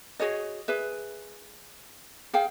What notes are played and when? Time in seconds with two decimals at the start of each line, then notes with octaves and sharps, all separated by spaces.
0.20 F#4 G#4 C#5 D#5
0.68 G#4 B4 E5
2.33 G#4 F5 G5